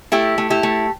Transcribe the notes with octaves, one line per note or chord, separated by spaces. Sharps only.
A3 E4 G4
A3
E4 G4
A3